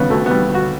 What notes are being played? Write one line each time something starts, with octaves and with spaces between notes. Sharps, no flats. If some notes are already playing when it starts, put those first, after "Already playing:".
Already playing: C#3 G3 B3
D2 A3
G3 B3
D2
F#4